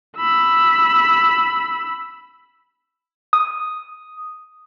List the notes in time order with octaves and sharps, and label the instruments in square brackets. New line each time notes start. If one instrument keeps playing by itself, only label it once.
[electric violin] B5 E6
[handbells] D#6